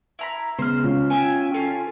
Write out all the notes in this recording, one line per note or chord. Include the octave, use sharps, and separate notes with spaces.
E4 A#5 B5
C#3 G#3 B3 C5 F6
C#4 F4
E5 G5 G#5
C#4 F4 A4